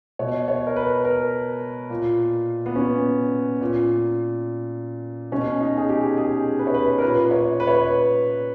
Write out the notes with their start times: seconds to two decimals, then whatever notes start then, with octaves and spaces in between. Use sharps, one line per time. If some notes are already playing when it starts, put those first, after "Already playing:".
0.19 B2 C#5
0.48 C#5
0.67 A#4
0.76 B4
1.05 A#4
1.90 A#2
2.66 B3
2.76 C#4
3.61 A#2
5.32 B2 C#4
5.60 D#4
5.77 G#4
5.89 G4
6.17 G#4
6.59 B4
6.67 C#5
6.74 B4
6.98 A#4
7.02 A#2 B4
7.31 C#5
7.60 B4
7.67 C#5
7.75 B4